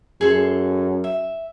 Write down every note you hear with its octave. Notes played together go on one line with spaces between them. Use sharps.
F#2 G#4 A4 C6
E5